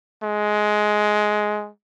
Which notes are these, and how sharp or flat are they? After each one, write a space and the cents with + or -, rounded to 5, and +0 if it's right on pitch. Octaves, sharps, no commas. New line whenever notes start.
G#3 +15